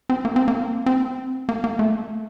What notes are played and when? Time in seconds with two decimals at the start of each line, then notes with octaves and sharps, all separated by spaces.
0.09 C4
0.25 A#3
0.36 C4
0.48 A#3
0.86 C4
1.49 A#3
1.64 A#3
1.79 A3